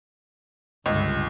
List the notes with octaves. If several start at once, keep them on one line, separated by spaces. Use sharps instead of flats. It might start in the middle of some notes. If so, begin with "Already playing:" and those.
C#2 G2 D3